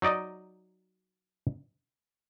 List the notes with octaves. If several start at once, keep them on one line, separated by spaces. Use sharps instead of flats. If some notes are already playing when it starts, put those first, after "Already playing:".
F#3 D#4 D5 D#5